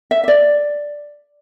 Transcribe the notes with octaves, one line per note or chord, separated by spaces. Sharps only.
E5
E5
D5